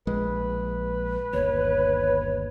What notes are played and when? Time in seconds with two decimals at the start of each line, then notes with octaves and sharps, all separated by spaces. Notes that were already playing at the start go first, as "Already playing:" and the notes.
0.07 A#1 G#3 B4
1.33 G1 D#2 C#5